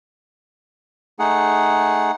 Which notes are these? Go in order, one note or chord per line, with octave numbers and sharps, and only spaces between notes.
A3 D#4 G#4 F#5